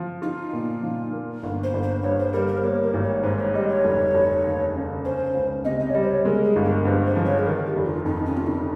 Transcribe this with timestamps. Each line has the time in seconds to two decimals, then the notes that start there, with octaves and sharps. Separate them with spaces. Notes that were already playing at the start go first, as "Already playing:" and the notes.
Already playing: F3
0.22 D#4 F4
0.53 A#2
0.82 F3
1.13 A#3
1.43 G1
1.63 C5
1.74 G1
1.83 C5
2.03 G2 C#5
2.19 C5
2.33 G3 A#4
2.48 A#4
2.57 C5
2.64 A#3 C#5
2.83 A#4
2.94 G#1
3.04 C#5
3.23 G#2 C5
3.39 C#5
3.54 G3 D#5
3.69 C#5
3.85 F1
4.14 F1
4.44 D#2
4.74 C#3
5.04 C#4 C5
5.35 C#2
5.65 C3 D#5
5.80 D#5
5.90 C#5
5.94 G3 D#5
6.04 C5
6.11 C#5
6.25 G#3 A#4
6.45 G#4
6.56 G1
6.65 A#4
6.85 G2 C5
7.05 C5
7.16 F3
7.25 C#5
7.39 G#4
7.46 D#3 A#4
7.66 G4
7.76 F1
7.85 F4
8.05 F2 D#4
8.26 C#4
8.36 C3 F4
8.47 D#4